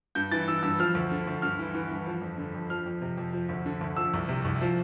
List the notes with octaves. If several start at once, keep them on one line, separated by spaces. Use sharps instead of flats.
G2 G6
E3 A6
E3 E6
G2 E6
F3 F6
D2
D3
D2
G2 F6
E3
E3
G2
F3
F2
D3
F2
F3 F6
F2
C3
F2
F3
D2
D3
D2
F3 E6
C2
C3
C2
F3